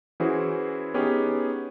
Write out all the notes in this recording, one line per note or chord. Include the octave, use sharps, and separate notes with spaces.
E3 C#4 E4 F#4 G#4 C5
B3 C#4 D#4 G4 G#4